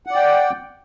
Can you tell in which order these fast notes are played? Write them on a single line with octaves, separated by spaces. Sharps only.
F#5 D5 G5